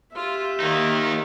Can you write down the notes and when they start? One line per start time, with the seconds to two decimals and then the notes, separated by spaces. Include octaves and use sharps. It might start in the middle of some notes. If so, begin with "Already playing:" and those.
0.15 F4 G4 E5
0.60 D#3 A#3 D#4 F4